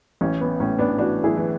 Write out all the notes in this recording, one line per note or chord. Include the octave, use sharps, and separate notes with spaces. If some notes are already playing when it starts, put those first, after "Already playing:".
A1 C#4
B3
A2 C#4
B3 D4
E3 D4 F#4
E4 G#4
E3